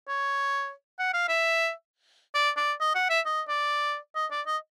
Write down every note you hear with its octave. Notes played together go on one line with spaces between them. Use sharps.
C#5
F#5
F5
E5
D5
D5
D#5
F#5
E5
D#5
D5
D#5
D5
D#5